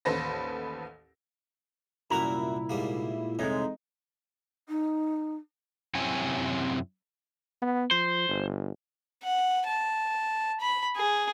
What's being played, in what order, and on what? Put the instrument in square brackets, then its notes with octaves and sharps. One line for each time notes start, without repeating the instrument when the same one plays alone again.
[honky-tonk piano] A1 D#2 A4 B4 C5 A#6
[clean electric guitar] C2 A#5 [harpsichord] F#2 F#4 A#4 [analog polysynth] A#2 E4
[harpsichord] G#2 G3 A#3
[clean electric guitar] C2 C#5 [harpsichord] F2 E3 [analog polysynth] G#3 D#4
[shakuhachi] D#4
[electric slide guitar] F#2 C3 C4 E4 C#5 G#5
[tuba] B3
[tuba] F3 [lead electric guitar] C5
[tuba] G1
[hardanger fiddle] F#5
A5
B5
G#4